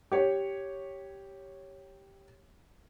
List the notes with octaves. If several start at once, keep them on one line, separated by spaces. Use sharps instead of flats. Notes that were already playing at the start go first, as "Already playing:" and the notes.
G4 C#5